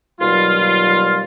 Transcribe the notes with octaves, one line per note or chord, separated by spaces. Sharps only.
D#2 B2 F#3 G3 F4